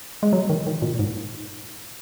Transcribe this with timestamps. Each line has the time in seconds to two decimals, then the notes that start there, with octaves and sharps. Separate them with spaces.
0.23 G#3
0.33 F#3
0.49 D#3
0.67 D#3
0.82 A#2
0.99 G#2